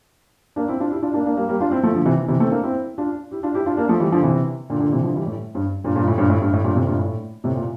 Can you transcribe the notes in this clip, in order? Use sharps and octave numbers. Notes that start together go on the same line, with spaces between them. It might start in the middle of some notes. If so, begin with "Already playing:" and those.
A#3 D4
C4 E4
D4 F4
E4 G4
D4 F4
A#3 D4
A#3 D4
G3 A#3
G3 A#3
D4 F4
C4 E4
F3 A3
D3 F3
C3 E3
C3 E3
A3 C4
A#3 D4
C4 E4
D4 F4
E4 G4
D4 F4
E4 G4
D4 F4
A#3 D4
F3 A3
E3 G3
D3 F3
C3 E3
A#2 D3
A#2 D3
C3 E3
D3 F3
E3 G3
A2
G2
G2 A#2
G2 A#2
A2
G2 A#2
A2
G2
A2
G2 A#2
A2 C3
G2 A#2
A2
A2 C3
A#2